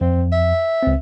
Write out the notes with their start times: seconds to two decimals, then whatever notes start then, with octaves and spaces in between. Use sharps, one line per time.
0.01 F2 C4
0.32 E5
0.83 C#2 C4